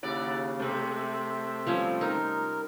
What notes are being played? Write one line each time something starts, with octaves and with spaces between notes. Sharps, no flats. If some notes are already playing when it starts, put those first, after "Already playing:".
D#2 C#3 E4 D5 F#5 A#5
C3 G#3 A3 C4
E5
F3 G3 C#4
D#4 A#4